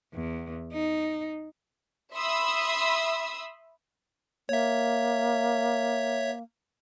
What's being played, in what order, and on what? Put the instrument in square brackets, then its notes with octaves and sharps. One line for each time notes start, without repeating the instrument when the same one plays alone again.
[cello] E2
D#4
[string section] E5 B5 C6 D#6 E6
[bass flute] A#3 [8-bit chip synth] C#5 E5